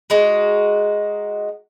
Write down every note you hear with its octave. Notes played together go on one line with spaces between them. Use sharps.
G#3 D#4 F#4